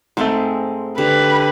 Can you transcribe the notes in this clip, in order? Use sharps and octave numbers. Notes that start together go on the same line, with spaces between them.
G#2 G#3 A3 C4
D3 G4 B4